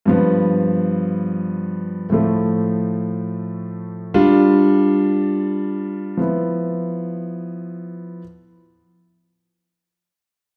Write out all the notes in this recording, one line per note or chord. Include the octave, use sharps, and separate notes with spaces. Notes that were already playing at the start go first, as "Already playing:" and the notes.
G2 F3 B3
A2 F3 A3
G3 D4 F4
F3 B3 E4